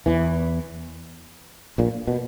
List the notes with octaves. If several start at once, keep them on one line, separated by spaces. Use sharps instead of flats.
E2 E3
A#1 A#2
B2